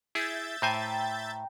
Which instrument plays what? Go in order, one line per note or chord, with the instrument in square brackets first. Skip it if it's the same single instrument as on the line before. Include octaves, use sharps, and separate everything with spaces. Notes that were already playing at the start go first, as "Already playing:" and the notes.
[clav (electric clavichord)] E4 G#4 [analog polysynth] E5 G6 A6
[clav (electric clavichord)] A2 C5 G#5 [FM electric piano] G5 A#5